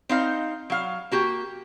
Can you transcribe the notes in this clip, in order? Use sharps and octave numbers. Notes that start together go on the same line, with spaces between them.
C4 D#4 F5
F#3 F5
A#3 F#4 G4